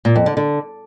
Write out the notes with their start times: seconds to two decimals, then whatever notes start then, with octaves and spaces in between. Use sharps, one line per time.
0.05 A#2
0.16 F2
0.26 D3
0.37 D3